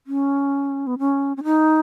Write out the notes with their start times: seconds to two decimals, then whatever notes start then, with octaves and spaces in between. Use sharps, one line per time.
0.07 C#4
0.87 B3
0.99 C#4
1.37 C#4
1.44 D#4